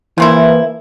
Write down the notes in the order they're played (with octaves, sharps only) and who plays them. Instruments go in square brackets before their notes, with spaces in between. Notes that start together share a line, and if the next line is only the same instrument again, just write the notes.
[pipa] C#3 F3 E4 [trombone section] E3 A#3